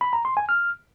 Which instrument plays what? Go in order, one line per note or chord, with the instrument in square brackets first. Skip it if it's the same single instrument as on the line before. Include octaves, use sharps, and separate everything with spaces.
[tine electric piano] B5
A#5
C6
G#5
F6